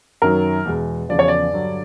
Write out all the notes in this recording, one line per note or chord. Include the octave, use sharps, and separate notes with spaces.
F#2 D#3 F#3 A#4
E2 B2 G#3
E2 C#3 F3 D5
C#5
D5
G2 D3 F#3